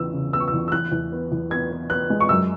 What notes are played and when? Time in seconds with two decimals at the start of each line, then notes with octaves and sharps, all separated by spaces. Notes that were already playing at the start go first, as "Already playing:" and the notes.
Already playing: E2 C#3 B3 E6
0.14 C#3
0.33 B3 E6
0.40 C#6
0.48 E6
0.53 E2
0.68 E6
0.72 E2 F#6
0.92 E2
1.12 B3
1.32 E2
1.50 B3 G#6
1.71 B3
1.90 B3 F#6
2.10 G#3
2.20 C#6
2.29 F#2 E6